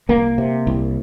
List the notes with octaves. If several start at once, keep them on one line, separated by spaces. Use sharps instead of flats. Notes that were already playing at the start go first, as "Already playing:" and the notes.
C2 A#3
C3
C2